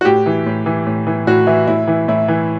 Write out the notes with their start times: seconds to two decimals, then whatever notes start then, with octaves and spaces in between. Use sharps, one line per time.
0.01 F#4
0.05 A2 G4
0.26 E3
0.46 A2
0.66 E3
0.87 A2
1.07 E3
1.27 A2 F#4
1.47 E3 E4
1.67 A2 E4
1.88 E3
2.08 A2 E4
2.28 E3